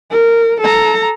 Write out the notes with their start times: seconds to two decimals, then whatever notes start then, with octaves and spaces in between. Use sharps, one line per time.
0.11 A#4
0.61 A4 A#5